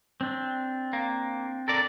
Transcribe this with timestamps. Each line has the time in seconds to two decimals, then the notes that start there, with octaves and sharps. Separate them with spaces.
0.21 C4 D4
0.93 A#3
1.68 A4 A#4 D5